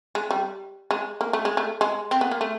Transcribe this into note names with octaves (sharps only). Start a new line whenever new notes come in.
G#3
G3
G#3
A#3
A3
G#3
A3
G#3
C4
B3
A#3
A3